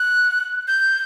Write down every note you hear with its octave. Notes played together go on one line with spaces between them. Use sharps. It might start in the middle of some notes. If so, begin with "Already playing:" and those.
Already playing: F#6
G6